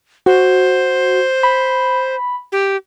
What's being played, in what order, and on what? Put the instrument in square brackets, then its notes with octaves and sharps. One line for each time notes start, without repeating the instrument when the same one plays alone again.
[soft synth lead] F#4 [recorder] C5
[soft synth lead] B5
[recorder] G4